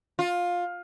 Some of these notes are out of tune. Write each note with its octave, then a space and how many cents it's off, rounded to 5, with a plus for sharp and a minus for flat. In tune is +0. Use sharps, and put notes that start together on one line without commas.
F4 +15